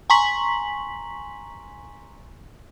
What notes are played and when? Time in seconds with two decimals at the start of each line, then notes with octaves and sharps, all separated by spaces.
0.10 G#5 A#5 C6 C#6 B6 F#7